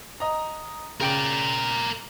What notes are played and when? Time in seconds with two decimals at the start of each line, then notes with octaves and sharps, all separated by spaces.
0.20 D#5 A#5
1.00 C#3 A#4 D5 G5 D7